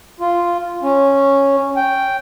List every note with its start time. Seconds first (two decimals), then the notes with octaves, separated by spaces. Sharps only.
0.20 F4
0.82 C#4
1.76 G5